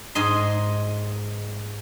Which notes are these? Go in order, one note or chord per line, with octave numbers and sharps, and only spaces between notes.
G#2 G#4 D#5 C6